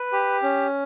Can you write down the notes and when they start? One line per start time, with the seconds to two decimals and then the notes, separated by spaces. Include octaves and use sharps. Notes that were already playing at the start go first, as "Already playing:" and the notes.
Already playing: B4
0.12 G4
0.43 C#4